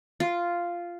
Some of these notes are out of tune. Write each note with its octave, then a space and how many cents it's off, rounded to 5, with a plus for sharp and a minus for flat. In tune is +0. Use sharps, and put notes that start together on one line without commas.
F4 -5